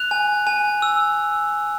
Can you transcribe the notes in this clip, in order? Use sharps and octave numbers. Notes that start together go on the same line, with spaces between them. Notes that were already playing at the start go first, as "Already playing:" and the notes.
Already playing: F#6 F7
G#5
G#5
E6